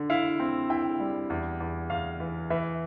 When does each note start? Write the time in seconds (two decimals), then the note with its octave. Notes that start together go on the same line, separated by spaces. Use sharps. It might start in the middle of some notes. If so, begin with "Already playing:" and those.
Already playing: D3
0.10 E4 F5
0.40 C4
0.70 E4 G5
1.00 G3
1.30 E2
1.60 E2
1.90 E2 F5
2.20 E3
2.50 E3 E5